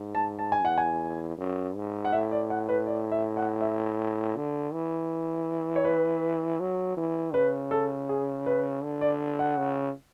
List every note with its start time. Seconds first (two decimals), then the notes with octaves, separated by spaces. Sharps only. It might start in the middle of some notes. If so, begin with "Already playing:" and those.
Already playing: G#2
0.15 A5
0.39 A5
0.52 G#5
0.63 E2 F#5
0.78 G#5
1.38 F#2
1.76 G#2
2.05 F#5
2.12 A2 E5
2.32 D5
2.50 F#5
2.69 B4
2.87 D5
3.12 E5
3.37 F#5
3.61 E5
4.36 D3
4.73 E3
5.76 C#5
5.85 B4
6.60 F#3
6.97 E3
7.34 C#3 B4
7.71 A4
8.09 G#4
8.46 B4
8.83 D3
9.01 D5
9.39 F#5
9.57 C#3